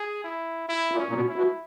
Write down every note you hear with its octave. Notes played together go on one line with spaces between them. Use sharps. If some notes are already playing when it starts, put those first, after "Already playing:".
Already playing: G#4
E4
E4
A#2
C#4
A#2
B2
E4
B2